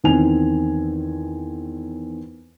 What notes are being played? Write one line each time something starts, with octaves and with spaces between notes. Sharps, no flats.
E2 D#3 C4 G#5 F7